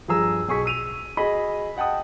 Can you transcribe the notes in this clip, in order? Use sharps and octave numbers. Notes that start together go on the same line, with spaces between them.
G2 F3 G#4 A#5 E6
B1 G#4 C#6 B6
E6 D#7 F7
F#4 G#4 D#5 B5
D#5 F#5 G5 A5 D#6